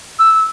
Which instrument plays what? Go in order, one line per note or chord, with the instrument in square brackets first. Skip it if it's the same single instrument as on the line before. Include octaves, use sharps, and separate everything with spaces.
[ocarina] E6